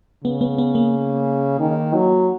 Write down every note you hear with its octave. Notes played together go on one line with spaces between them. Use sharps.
C#3 B3
B3
B3
A#3
D#3
F#3